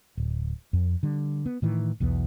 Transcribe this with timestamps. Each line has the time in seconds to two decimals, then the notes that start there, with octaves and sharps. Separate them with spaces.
0.18 D1
0.73 F2
1.03 D3 G3
1.46 B3
1.62 A2 D#3 E3
2.00 B1 E2 D#3 B3